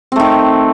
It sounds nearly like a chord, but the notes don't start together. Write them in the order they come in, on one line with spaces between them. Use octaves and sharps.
C4 A3 D#3